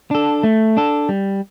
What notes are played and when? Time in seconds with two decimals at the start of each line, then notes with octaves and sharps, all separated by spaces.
0.11 D4 A4
0.43 A3
0.77 D4 A4
1.09 G3